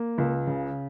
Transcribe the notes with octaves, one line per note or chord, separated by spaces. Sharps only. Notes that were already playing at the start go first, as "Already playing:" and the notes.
Already playing: A#3
C#2
C#3